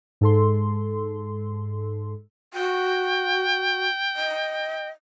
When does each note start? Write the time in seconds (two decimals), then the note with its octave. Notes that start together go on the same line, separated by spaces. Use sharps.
0.21 G#2 A4 C6
2.54 F#4 G5
4.16 D#5